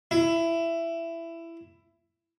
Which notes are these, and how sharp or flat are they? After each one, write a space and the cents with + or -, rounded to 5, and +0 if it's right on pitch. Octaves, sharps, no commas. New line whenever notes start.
E4 +15